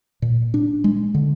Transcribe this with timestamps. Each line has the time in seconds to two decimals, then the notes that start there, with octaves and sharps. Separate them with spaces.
0.22 A#2
0.54 D4
0.84 G#3
1.15 D3